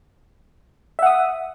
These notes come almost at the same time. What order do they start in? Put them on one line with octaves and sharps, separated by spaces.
E5 F#5 D#6